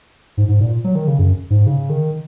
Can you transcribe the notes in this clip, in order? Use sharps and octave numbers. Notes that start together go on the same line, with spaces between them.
G#2
G#2
A#2
F#3
D#3
C#3
F#2
G#2
C#3
D#3